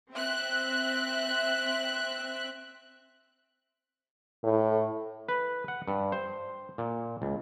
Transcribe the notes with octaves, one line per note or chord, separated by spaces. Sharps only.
C4 E5 F#6
A2
B4
F#5
G2
C5
A#2
C#2